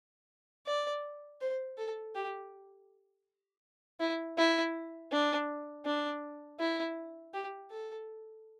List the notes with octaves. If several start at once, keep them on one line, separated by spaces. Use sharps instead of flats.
D5
C5
A4
G4
E4
E4
D4
D4
E4
G4
A4